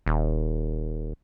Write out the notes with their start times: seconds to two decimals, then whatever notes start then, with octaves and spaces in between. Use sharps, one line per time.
0.06 D#1